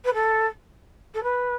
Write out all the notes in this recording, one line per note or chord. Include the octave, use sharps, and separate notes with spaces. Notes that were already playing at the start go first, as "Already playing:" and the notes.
B4
A4
A4
B4